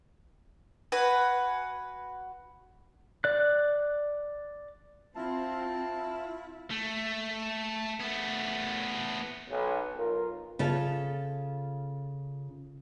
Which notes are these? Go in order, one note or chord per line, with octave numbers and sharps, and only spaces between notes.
F#4 B4 G#5
D5 F#6
C4 E4 F4 A5
A3
A3 B3
B1
B1 F4 A#4
C#3 F4 A4 E5